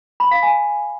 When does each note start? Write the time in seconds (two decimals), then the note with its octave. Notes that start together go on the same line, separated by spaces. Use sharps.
0.20 B5
0.31 F5
0.43 G#5